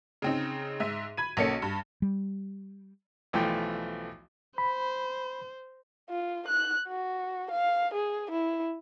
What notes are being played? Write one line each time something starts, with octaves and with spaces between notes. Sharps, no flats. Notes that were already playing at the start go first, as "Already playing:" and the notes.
C#3 C4 D#4
G#2 E5 D#7
B5 G#6 D#7
B1 A#3 C#4 A4 C#7
G2
G3
B1 E3 F3 A3 G5
C5 B5
F4
F#6
F#4
F5
G#4
E4